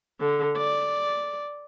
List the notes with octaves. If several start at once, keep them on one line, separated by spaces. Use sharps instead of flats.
D3
D5